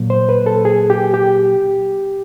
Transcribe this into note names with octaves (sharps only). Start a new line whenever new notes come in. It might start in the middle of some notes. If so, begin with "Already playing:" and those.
Already playing: A#2 F#3 A#3
C5
B4
A4
G#4
G4
G4